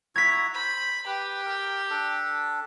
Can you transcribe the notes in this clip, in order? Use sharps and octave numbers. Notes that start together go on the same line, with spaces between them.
E4 F#4 A#5 G#6 B6
C5 B5
G4 B4
A#4
D4 A4